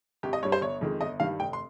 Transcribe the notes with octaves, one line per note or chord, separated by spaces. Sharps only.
G#1 G4
D#5
G2 G3 C#5
C5
G1 C#5
F2 D#3 G#3
G1 D#5
G2 D#3 G3 F5
F1 G5
C6